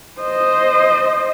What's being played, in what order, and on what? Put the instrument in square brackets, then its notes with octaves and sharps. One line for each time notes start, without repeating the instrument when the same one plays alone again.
[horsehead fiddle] C5 D#5